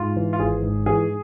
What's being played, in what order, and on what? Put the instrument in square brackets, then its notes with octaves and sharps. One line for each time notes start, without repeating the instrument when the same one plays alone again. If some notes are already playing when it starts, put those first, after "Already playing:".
Already playing: [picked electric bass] G#2 [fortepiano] F4
[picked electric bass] E3
[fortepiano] F4
[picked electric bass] G#1 [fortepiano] G#4
[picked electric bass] G#2
[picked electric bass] E3 [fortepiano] G#4